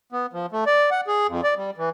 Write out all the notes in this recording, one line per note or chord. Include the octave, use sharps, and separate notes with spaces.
B3
F3
A3
D5
F#5
G#4
F2
D5
G3
E3